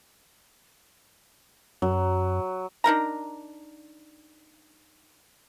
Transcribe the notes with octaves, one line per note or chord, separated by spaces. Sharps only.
F#2 F#3
D4 D#4 A#4 A#5